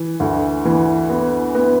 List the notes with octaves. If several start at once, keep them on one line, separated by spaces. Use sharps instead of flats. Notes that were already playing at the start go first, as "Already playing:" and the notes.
Already playing: E3
D2
E3
B3
B3